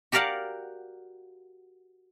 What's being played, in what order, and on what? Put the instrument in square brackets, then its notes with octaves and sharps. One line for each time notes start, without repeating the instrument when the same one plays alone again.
[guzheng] F#4 G4 A#4 D5 F5 F#5